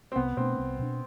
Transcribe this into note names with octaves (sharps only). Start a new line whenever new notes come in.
C4
C2 B3
B2 A3 C4 D4
C2
B2 A3 D4